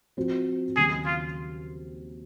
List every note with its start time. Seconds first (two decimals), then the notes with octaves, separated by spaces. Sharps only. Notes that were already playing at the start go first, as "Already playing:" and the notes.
0.17 F3 C4 F#4 C5
0.76 D#2 C#3 F#3 G#4
1.06 F4